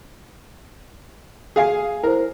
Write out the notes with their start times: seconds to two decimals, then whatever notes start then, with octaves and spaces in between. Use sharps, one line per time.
1.56 G#4 F5 G#5
2.04 E4 A#4 C5